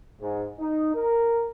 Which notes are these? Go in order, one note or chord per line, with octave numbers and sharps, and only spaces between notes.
G#2
D#4
A#4